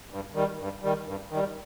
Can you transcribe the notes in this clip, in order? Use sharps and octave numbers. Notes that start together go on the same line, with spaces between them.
G2
D#3 G3
G2
D#3 G3
G2
D#3 G3